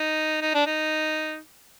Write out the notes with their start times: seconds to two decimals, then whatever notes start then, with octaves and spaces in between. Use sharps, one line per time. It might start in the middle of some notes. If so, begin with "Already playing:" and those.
Already playing: D#4
0.41 D#4
0.55 D4
0.67 D#4